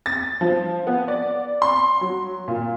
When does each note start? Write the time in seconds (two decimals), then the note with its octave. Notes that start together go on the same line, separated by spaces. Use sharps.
0.06 A6
0.41 F3
0.87 B3
1.08 D5
1.62 C6
2.01 F#3
2.48 A#2